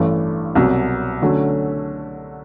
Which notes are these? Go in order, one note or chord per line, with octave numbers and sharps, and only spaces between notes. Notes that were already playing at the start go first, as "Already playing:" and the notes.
Already playing: A1 G2 E3 A3 D4
C2 B2 F#3 B3
D3 F#3 A3 C#4